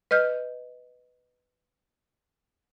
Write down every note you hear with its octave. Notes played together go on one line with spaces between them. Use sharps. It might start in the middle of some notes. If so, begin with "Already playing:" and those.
B4 D#5 F6 G6